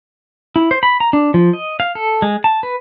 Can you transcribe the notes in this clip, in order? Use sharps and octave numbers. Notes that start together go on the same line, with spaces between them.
E4
C5
B5
A#5
D4
F3
D#5
F5
A4
G#3
A5
B4